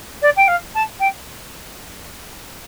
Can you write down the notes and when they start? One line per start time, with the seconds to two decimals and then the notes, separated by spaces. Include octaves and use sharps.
0.22 D5
0.36 G5
0.48 F5
0.74 A5
0.99 G5